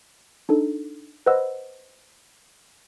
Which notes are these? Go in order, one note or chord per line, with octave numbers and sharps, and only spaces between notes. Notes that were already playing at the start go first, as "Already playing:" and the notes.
D4 D#4 A4
B4 C5 D#5 F#5 E6